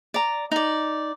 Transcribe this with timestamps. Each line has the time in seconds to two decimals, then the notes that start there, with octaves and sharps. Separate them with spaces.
0.14 D5 A#5
0.52 D#4 D5